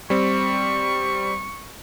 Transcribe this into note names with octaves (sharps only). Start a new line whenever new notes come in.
G3 C4 C#6